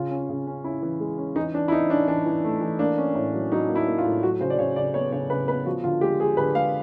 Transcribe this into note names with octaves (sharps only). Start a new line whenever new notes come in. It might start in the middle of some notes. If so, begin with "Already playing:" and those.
Already playing: C#3 F4
C#4
C#3
C#4
C#4 E4
E3
G#3
C#4
E3 D#4
E3 D4
E4
E3 D#4
C#4 D4
E3 D4
E3
A3
E3
A#3 D4
C#4
A2
F#3
F#3 D#4
A#3
E4
A#3
F4
A2
F#3 F#4
C#3 C5
D5
C#3 C#5
C#3 D5
B3 C#5
C#3 C#5
C#3 B4
B3 B4
F3 F#4
D3 F4
G#3 G4
G#3 G#4
D3 B4
G#3 F5